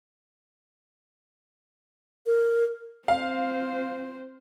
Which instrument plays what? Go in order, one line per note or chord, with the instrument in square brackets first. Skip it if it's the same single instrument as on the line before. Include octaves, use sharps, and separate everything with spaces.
[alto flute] A#4
[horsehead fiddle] C4 C5 [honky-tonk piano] F5